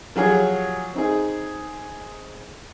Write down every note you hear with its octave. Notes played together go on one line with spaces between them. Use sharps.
F3 F#3 G4 G#4 C#5
C4 D#4 G#4